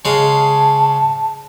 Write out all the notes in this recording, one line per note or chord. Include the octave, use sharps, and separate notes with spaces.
C#3 G#3 F5 A5